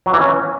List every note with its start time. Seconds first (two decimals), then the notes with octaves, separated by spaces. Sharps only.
0.06 F#3
0.13 E3
0.21 C#4